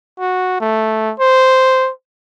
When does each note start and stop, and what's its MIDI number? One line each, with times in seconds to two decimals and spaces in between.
0.20 0.58 66
0.61 1.13 57
1.20 1.90 72